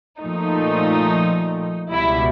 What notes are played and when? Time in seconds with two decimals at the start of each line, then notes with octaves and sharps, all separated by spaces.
0.20 A#2 F3 A3 D#4
1.92 C#2 B2 G3 E4